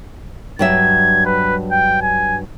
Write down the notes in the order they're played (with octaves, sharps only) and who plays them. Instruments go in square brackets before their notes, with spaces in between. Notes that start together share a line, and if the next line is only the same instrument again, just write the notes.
[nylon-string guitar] G2 F#3 E5 [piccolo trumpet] G#6
[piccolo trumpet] B4
G5
G#5